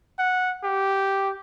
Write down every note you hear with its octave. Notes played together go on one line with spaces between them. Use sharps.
F#5
G4